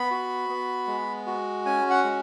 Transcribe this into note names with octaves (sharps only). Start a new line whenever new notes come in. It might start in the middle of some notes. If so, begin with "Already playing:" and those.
Already playing: B3 B5
F#4
B3
G#3
F#4
C#4 G#5
F#5
G#3